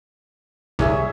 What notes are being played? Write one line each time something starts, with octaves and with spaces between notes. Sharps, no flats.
C2 C3 G#4 C#5 E5